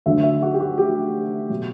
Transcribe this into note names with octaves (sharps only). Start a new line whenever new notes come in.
D2 D3 F#3 E5
E5
F#4
G4
F#4
G4
B2 F#3